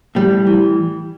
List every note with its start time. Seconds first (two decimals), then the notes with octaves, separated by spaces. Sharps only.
0.15 A2 G3
0.47 E3